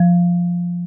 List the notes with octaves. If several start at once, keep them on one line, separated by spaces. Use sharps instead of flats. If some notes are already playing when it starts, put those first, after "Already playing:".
Already playing: F3